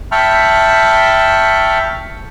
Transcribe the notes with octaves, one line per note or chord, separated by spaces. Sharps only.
E5 G5 A5 B5 C#6 F6